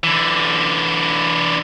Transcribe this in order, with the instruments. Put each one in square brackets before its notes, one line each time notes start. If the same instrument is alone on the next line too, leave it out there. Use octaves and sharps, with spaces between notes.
[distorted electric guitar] D3 E3